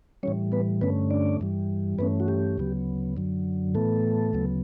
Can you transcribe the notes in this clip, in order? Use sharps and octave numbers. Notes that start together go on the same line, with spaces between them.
A2 E3 G3 C#4 C#5
B3 B4
G2 D3 A3 B3 C#4 B4
D4 D5
G2 E3 G3
G2 E3 A3 B3 C#4 B4
F#4
G4
D2 C#3 F#3 B3
F#2 D3 F#3
A2 E3 A3 B3 A4
D2 C#3 F#3 B3